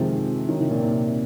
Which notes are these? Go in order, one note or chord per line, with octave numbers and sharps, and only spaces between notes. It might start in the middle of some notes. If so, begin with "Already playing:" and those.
Already playing: C3 D#3 F3 G#3
D#3 F#3
C3 D#3
A#2
C3